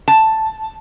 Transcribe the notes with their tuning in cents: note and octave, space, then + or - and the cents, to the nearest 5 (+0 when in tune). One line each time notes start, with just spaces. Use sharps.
A5 +5